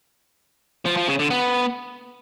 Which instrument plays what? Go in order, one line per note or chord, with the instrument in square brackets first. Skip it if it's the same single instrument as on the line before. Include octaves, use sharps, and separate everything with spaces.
[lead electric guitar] F3
F3
C#3
D3
B3